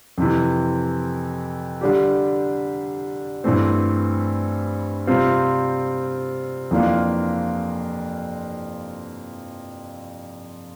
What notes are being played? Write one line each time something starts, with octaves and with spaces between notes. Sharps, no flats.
F2 C3 E3
D3 G3 D4 G4
G2 E3 A3 C4
C3 G3 C4 F4
F2 E3 A#3 D4 F4